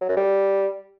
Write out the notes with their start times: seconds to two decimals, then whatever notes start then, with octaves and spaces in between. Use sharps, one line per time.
0.01 F#3
0.09 F#2
0.17 G3